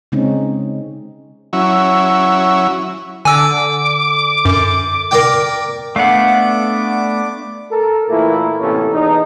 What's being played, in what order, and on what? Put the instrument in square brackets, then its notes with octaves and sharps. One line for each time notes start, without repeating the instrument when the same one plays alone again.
[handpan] C#3 G#3 C4 C#4 D#4
[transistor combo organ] F#3 C#4 E4
[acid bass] D3 [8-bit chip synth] G#5 E6 [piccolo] D6
[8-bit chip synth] F#2
[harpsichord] A#4 D5 G5
[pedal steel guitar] A3 B3 [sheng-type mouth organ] D4 D6 [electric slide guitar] F5 F#5
[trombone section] A4 A#4
A#2 E3 A3 A#3 E4
A1 A2 C3 A#3 C#4 A4
E2 D#4